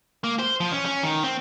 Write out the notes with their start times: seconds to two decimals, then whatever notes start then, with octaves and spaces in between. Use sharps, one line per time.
0.24 A#3
0.39 C5
0.60 F3
0.72 C#4
0.85 C#4
1.03 D#3
1.23 C4